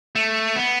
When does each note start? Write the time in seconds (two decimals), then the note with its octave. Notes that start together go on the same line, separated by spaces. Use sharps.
0.16 A3
0.56 B3